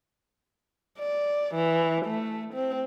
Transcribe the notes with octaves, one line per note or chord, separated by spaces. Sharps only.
D5
E3
A3
C4